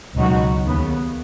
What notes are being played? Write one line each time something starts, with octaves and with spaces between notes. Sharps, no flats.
C#2 B2 F#3 D#4 F#4
D#2 C#3 B3